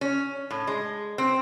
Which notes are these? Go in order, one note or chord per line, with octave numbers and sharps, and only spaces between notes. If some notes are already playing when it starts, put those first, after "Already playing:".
C#4
A2
G#3
C4